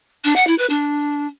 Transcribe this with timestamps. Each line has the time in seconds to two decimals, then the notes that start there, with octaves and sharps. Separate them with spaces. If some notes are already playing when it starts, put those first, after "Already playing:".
0.24 D4
0.35 F#5
0.47 E4
0.58 B4
0.69 D4